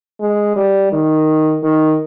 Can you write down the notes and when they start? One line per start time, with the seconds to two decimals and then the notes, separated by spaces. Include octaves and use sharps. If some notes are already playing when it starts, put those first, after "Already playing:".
0.20 G#3
0.56 G3
0.92 D#3
1.63 D#3